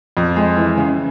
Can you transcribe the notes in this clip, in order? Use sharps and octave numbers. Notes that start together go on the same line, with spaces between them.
F2
G#3
E3
C#3